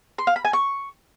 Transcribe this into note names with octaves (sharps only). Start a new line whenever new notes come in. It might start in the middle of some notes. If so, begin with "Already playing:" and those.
C6
F5
B5
G#5
C#6